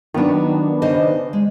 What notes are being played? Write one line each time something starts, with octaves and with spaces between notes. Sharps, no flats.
D#3 F#3 B3 D4 F4
C#3 C5 D#5
G#3